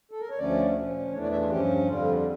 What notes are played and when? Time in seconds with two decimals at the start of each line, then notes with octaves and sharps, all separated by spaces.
0.11 A4
0.20 A#4
0.30 C#5
0.38 D2 D3 F3 A3 C#4 D5
0.76 A#2 F3 C#4
1.13 E2 E3 A3 D4 C#5
1.23 D5
1.32 E5
1.41 F4
1.50 G2 F3 C#4 G4
1.88 F2 D3 G3 F4